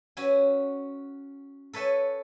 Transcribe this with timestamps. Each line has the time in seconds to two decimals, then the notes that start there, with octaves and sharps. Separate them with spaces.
0.17 C#4 F#4 B4 E5 G#5
1.73 A4 B4 C#5 E5 G#5